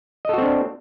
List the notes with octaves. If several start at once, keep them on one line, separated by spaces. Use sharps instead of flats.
C4 D4 F#4 A4 D#5